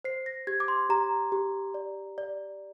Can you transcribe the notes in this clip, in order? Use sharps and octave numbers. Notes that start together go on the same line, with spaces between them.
C5 C7
A#6
G4 G#6
D6
C6
G4 A#5
G4
D5
D5